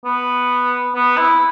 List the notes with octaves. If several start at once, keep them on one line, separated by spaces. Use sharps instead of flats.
B3
B3
E4